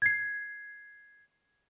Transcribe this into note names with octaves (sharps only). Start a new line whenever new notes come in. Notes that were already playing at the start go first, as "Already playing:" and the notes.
G#6 C7